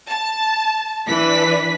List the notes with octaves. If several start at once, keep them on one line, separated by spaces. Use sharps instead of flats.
A5
E3 D4 B4 B6